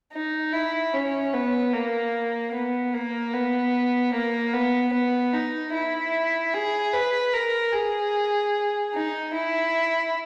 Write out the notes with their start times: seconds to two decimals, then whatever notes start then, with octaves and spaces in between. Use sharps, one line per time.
0.13 D#4
0.53 E4
0.93 C#4
1.33 B3
1.73 A#3
2.54 B3
2.94 A#3
3.33 B3
4.13 A#3
4.53 B3
4.93 B3
5.33 D#4
5.73 E4
6.53 G#4
6.93 B4
7.33 A#4
7.73 G#4
8.93 D#4
9.33 E4